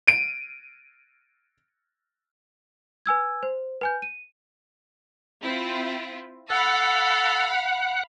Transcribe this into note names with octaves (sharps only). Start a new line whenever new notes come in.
D7 D#7
B4 G#5 E6 G#6
C5
B4 G#5 G6
D#7
C4 E4 F4
A4 F5 F#5 B5